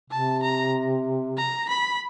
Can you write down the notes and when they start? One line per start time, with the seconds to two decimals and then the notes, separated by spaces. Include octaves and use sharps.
0.10 C3 A5
0.42 A#5
1.37 A#5
1.68 B5